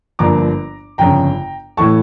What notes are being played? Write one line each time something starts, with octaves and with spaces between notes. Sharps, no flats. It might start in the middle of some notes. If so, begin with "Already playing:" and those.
G1 G2 F3 A#3 A#5 D6
G1 F2 C#3 G5 A#5
A2 E3 A3 A5 C#6